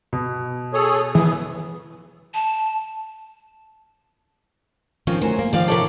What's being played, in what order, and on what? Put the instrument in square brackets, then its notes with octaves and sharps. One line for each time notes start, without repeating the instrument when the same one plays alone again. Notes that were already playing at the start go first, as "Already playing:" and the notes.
[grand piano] B2
[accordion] G#4 A4 C#5
[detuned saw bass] E3 [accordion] B3 G#4
[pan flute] A5
[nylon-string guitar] D#3 F3 C4 [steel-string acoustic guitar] C#4
[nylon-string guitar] F#3 C#4 [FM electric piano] A3 A#4 G#5 [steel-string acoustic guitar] C5
[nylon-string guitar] A#3
[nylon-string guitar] D#3 F3 [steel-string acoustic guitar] D5 F5
[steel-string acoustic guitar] C3 A4 D5 [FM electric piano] A#4 C#5 A5